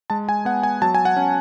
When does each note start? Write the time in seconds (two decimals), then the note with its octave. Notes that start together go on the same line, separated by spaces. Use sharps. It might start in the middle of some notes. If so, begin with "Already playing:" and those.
0.10 G#3 A5
0.29 G#5
0.45 B3 F#5
0.63 G#5
0.82 F#3 A5
0.95 G#5
1.05 F#5
1.17 C#4